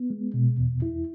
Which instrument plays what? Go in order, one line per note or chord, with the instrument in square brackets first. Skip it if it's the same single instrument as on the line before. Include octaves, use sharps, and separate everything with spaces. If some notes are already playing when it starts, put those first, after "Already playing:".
Already playing: [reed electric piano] B3
G#3
B2
E2
E4